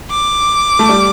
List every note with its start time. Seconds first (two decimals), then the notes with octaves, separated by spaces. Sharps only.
0.11 D6
0.79 A3
0.89 G3